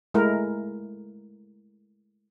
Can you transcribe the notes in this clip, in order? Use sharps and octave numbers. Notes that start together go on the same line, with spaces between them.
G#3 A3 E4 A#4